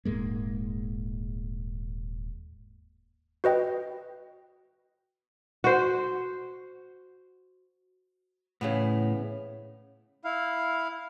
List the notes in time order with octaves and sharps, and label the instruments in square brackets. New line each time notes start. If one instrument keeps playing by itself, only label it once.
[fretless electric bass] D#1 G#2 G#3 A#3
[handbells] F#4 B4 D#5 G5
[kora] F#4 C5
[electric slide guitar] A2 [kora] C#3 E3 B3
[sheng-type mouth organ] E4 F5